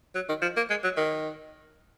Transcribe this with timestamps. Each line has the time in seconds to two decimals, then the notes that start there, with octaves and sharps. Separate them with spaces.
0.15 F#3
0.29 D#3
0.42 F3
0.57 A#3
0.70 G#3
0.84 F#3
0.97 D#3